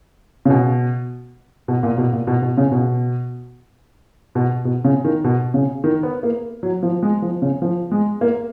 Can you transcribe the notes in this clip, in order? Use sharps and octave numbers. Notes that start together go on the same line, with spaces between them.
C#3
B2
B2
A#2
B2
A#2
B2
B2
C#3
B2
B2
B2
C#3
D#3
B2
C#3
D#3
B3
A#3
F#3
F3
G#3
F3
C#3
F3
G#3
A#3